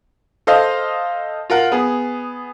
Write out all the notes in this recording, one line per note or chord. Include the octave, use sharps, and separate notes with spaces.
A4 C5 D#5 F5
F4 A#4 F#5
B3 G#4